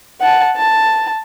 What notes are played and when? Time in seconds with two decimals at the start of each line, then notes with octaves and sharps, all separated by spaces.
0.21 F#5 A5
0.57 A5